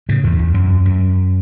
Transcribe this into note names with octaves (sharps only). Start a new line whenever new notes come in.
A2 C#3
E2 G#2
E2
F#2
F#2